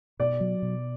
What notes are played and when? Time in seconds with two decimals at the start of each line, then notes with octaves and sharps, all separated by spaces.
0.20 B2 D5
0.40 F#3
0.62 B2